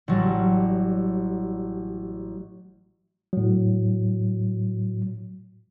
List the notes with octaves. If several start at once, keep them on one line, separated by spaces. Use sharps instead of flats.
A1 F#3 G3
A2 F#3